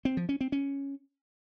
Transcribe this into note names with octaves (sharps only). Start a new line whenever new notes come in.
C4
F3
C#4
C4
C#4